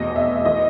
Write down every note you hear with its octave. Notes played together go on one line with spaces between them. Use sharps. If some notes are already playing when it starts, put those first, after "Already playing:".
Already playing: F1 E2 B2 D#5
E5
E3 D#5